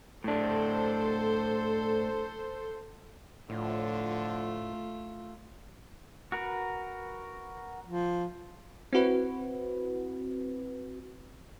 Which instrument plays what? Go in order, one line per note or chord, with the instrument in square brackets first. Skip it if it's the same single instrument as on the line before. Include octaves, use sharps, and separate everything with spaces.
[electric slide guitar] A2 D4 [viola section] A4 C5
[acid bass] A2 [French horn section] D3 F3 [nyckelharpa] A3 F4
[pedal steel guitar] F#4 A#4 B4
[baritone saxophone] F3
[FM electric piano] C4 E4 F#4 B4